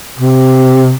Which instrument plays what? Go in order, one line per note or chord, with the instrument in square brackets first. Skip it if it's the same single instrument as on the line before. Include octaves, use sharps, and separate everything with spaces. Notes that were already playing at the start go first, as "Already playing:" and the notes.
[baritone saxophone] C3